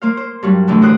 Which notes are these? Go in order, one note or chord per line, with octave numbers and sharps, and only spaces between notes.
A#3 C5 F5
C5
G2 F#3 G3
A2 D3 E3
D#2 F#4 C5 G5 D#6 F#6